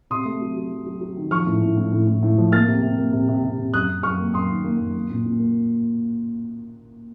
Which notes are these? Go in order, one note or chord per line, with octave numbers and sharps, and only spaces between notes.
C3 C6 D#6
A3
F#3
F#3
F#3
F#3
F#3
D#3
F3 C#6 F6
A2
A2
A2
A2
A2
A2
F3
A#3 F6 A6
C3
C3
A#3
C3
C3
C3
C3
F#2 D#6 F#6
F#2
F#2 C#6 F6
A#3
F#2 C6 D#6
D#3
A#3
F#2
A#3
A#2
A#2
A#3